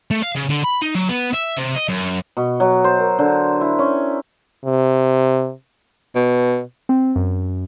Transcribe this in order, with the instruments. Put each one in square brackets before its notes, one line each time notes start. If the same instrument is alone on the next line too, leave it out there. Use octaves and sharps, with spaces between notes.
[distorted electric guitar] A3
F5
C#3
D3
B5
D#4
F#3
B3
E5
C3
D#5
F#2
[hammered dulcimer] B2
F#3
C5
A#4
D3
E4
C#4
[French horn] C3
[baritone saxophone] B2
[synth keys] C4
F#2